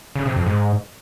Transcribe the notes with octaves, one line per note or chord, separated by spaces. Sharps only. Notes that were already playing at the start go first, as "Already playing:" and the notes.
C#3
C3
F2
G#2